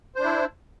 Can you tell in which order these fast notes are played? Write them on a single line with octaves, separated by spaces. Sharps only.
C5 D4 E4